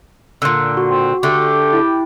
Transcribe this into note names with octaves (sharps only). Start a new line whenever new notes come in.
A#2 D3 E6
F#4
C4
D3 A3 G4
E4 G5